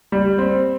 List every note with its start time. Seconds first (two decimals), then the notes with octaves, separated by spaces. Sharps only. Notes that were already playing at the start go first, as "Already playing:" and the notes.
0.12 G3
0.38 C4